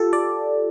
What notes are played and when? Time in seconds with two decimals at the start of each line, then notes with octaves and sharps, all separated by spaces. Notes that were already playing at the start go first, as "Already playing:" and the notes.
Already playing: F4 G4 A4
0.13 D5